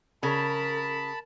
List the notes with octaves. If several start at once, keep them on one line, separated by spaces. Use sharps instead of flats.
C#3 A#4 A5 B5